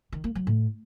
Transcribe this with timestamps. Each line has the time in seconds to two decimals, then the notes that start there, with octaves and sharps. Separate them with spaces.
0.13 D#3
0.24 A#3
0.35 F#3
0.47 A2